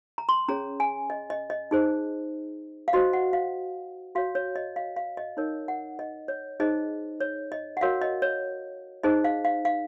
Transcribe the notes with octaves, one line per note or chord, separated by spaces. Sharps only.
A#5
C6
C#4 G#4 C#5 A#5
G#5
D#5
D#5
D#5
D#4 G#4 C5
F5
F#4 C5 D#5
F#5
F5
F#4 C#5 F5
C#5
D#5
F5
F5
D#5
D#4 A#4 C#5
F#5
D#5
C#5
D#4 G#4 C5 D#5
C#5
D#5
F#5
F#4 A#4 C#5 F5
D#5
C#5
D#4 G#4 C5 D#5
F5
F5
F5